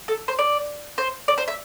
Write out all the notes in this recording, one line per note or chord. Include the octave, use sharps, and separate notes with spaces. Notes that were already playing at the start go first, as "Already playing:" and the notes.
A4
C5
D5
C5
D5
C5
E5